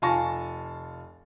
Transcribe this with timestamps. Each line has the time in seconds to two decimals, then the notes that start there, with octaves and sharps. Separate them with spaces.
0.02 F1 F4 G#5 A5 C#6 A#6